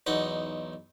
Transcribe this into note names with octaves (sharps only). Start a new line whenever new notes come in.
B1 E2 D#4 F#5